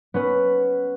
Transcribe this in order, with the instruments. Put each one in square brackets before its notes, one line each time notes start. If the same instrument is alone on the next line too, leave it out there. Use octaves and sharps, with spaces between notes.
[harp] B3 C#4 B4